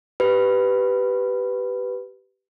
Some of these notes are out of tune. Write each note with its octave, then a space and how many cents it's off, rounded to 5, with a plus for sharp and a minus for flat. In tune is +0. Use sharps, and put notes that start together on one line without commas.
G4 -15 B4 +5